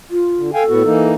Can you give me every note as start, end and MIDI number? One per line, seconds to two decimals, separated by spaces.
0.11 0.51 65
0.37 0.51 50
0.54 1.09 69
0.54 0.63 77
0.54 0.63 79
0.54 0.63 80
0.69 0.82 45
0.69 0.82 59
0.69 0.82 66
0.85 1.14 52
0.85 1.14 58
0.85 1.14 63